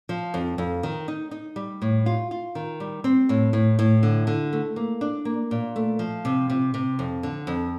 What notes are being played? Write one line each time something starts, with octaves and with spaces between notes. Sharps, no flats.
F3
F2
F2
D#3
D#4
D#4
G3
A2
F4
F4
D#3
G3
C4
A2
A2
A2
D3
D3
A3
A#3
D4
A#3
A#2
A3
F3
C3
C3
C3
F2
D3
F2